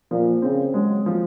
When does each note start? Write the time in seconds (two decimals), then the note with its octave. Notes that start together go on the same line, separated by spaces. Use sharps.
0.11 A#2 F3
0.42 C#3 C4
0.74 F#3 G#3
1.06 F3